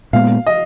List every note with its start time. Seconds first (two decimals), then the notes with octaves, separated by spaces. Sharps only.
0.13 A#2 G#3 B3 F5
0.47 D#5